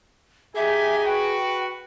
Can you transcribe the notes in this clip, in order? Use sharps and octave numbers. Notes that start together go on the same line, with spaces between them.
D#4 G4 G#4 E5 G#5
F#4 B4 G5